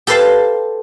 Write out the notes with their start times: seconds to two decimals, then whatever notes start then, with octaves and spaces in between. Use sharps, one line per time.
0.07 G4 A4 B4 C5 F5 A5